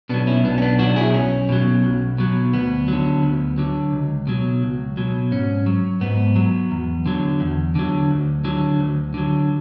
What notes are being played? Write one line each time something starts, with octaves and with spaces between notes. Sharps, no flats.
B2 F#3 B3 D4
C#4 E4
B1 B3 D4
C#4
B3 D4
B2 F#3 D4 F#4
E4 G#4
B1 C#4
B2 F#3
B1
B2 F#3
D2 B3
D3 F#3
D2
D3 F#3
C#2
B2 F#3
C#2
B2 F#3
G#2 C#4
F#3
G#2 B3
F#3
E2
D3 F#3
E2
D3 F#3
D2
D3 F#3
D2
D3 F#3